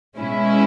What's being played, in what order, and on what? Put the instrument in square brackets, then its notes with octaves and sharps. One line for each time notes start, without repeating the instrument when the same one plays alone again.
[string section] B2 G#3 C#4 E4